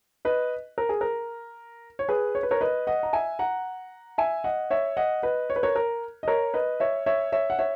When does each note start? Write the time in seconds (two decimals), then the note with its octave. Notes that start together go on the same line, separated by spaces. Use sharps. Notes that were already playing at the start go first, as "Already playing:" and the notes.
0.25 B4 D#5
0.78 A#4
0.89 G#4
1.01 A#4
1.99 C#5
2.09 G#4 B4
2.35 C#5
2.43 B4
2.51 A#4 C#5
2.61 B4 D#5
2.87 D#5 F#5
3.03 A#5
3.13 E5 G#5
3.39 F#5 A#5
4.18 E5 G#5
4.44 D#5 F#5
4.71 C#5 E5
4.97 D#5 F#5
5.23 B4 D#5
5.50 C#5
5.56 B4
5.63 A#4 C#5
5.76 A#4
6.23 D#5
6.28 A#4 C#5
6.54 B4 D#5
6.80 C#5 E5
7.06 C#5 E5
7.32 C#5 E5
7.50 F#5
7.59 C#5 E5